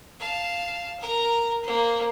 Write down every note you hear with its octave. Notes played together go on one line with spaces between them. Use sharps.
F5 A5
A#4 A#5
A#3 C5